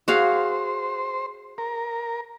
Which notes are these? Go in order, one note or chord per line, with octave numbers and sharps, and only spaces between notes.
F#4 G#4 C5 F5
A#4